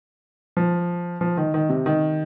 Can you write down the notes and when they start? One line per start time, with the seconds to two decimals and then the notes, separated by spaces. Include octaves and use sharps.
0.57 F3
1.21 F3
1.37 D#3
1.54 D#3
1.69 C3
1.86 D#3